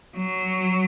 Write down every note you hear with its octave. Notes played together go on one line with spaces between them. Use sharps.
F#3